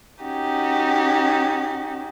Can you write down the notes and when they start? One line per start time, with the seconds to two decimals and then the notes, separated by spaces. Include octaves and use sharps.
0.23 C#4 D#4 F#4 G4